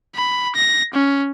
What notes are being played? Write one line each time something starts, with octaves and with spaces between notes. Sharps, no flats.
B5
A#6
C#4